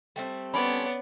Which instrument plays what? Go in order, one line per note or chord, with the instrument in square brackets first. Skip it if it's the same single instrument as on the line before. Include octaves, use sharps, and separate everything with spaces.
[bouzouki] G3 A3 C4
[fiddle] B3 D5 [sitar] C#4 [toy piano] B5